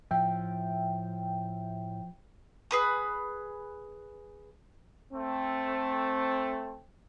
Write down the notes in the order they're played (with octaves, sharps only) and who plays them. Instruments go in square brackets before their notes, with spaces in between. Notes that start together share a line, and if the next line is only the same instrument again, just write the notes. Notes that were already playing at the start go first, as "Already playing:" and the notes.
[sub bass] A2 [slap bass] F3 [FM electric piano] E5 G5
[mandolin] G#4 B4 D#6
[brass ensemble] A3 C4